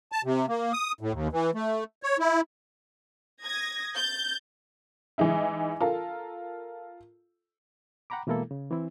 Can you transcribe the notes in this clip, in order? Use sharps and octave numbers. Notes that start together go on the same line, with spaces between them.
A5
C3
A#3
D#6
A2
D#2
E3
A3
C#5
E4
D#6 G#6 A#6
G6 A6
E3 G#3 D#4 E4
F4 A4 A#4
F#5 G5 A#5 B5 D6
B2 E3 G#3 A#3 E4 A4
C#3
E3 C4 E4